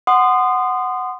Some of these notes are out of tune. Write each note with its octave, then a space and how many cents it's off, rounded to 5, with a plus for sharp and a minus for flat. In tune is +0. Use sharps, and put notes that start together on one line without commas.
F#5 +0 C6 -20 D#6 -20